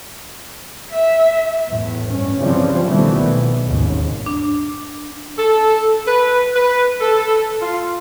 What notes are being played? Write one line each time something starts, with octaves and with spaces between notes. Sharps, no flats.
E5
E2 A2
G2 C#4
C#3 E3 F3 G3 C4
B2 D#3 E3 G3 A3 B3
B1
G#1 D#2 G#2 C#3
D4
A4
B4
B4
A4
F4